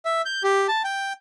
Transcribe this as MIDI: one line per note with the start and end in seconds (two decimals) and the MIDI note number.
0.05 0.22 76
0.26 0.43 91
0.44 0.67 67
0.68 0.82 81
0.84 1.13 79